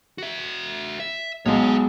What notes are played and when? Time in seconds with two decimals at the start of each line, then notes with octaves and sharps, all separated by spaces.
0.18 F#4 E5
1.00 E5
1.46 B1 G#3 C#5 F5